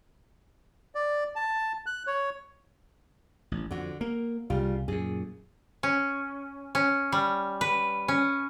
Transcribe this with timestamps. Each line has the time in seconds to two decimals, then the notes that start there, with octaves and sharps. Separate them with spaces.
0.95 D5
1.36 A5
1.86 F#6
2.07 C#5
3.52 A1
3.71 F2 D3 F#4
4.01 A#3 A#4
4.50 C2 C#3 G3 F4
4.88 F#2 A#2 G#4
5.83 C#4
6.75 C#4
7.12 G3
7.61 B4
8.08 C#4